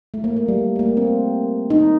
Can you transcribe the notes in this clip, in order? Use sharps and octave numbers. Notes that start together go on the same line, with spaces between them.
A3
A#3
A3
G3
A3
A#3
C4
D#4